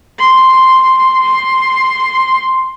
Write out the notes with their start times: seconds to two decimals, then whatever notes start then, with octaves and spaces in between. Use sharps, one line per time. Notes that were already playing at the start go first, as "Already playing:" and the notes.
0.19 C6
1.22 C6